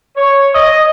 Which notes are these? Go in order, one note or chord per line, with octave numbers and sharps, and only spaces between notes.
C#5
D#5